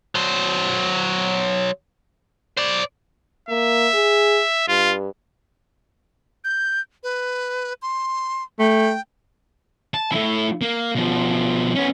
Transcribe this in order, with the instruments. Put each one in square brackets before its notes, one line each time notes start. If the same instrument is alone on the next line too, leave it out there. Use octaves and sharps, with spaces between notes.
[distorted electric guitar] F#3 C5
C5 D5
[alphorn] A#3 [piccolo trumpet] E5
[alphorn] G#4
[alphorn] G2 [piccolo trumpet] F4
[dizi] G6
B4
C6
[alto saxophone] A3 [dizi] G5
[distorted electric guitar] A5
A3 E4
A#3
B2 F3
B3 C#4